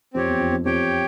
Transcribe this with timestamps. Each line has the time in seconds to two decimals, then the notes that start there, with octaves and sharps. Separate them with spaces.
0.14 F2 C4 G4 C#5
0.27 E2
0.40 F2
0.53 F2
0.65 F2 G4 C#5 G5